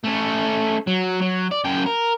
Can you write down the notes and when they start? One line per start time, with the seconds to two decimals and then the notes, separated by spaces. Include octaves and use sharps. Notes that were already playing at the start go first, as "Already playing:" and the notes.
0.04 A3 C#4
0.87 F#3
1.21 F#3
1.51 D5
1.64 F#2 G5
1.86 A#4